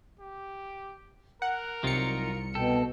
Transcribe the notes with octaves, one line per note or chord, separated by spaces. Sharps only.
G4
A#4 F#5
C2 F#3 D#4 F4 C#7
B2 A4 G5